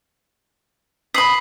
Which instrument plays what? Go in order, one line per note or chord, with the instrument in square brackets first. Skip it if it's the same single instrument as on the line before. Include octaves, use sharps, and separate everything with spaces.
[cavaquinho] B5 D#6 [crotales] B6 C7 F#7